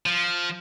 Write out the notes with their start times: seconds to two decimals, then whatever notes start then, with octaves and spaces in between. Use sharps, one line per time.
0.06 F3